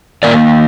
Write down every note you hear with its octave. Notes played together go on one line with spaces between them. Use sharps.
D#3 A#3 A#4 D5